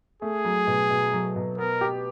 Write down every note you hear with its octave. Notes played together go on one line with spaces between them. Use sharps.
A3 G#4
F#3
B2
B2
F#3
B2
B3 A#4
G4